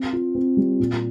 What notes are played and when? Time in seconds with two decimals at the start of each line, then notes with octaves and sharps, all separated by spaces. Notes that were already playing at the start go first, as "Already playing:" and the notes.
Already playing: C4
0.13 F4
0.35 C4
0.57 G3
0.80 A#2